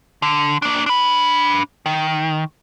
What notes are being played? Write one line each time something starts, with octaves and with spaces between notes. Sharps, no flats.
D3
A#3 D4
D4 B5
D#3